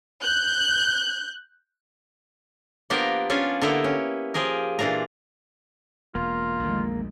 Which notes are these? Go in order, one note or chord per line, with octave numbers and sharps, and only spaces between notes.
F#6 G6
F3 A#3 B3 D4 G4 A#4
C#4 D4 F4 G#5
D3 A#3 B3 E4 G4 A#5
C#4
F3 G4 G#4 A#4
A#2 E3 D4 F4 A#5
E1 A#3 F4
A#1 E2 D#3 G#3 A3